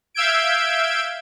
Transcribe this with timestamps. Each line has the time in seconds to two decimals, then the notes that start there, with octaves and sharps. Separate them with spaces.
0.14 E5 F5 E6 G6 G#6 D7